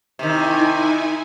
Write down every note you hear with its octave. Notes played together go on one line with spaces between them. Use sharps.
C3 D#3 D#4 E4 G#5